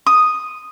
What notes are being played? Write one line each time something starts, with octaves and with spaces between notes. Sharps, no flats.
D#6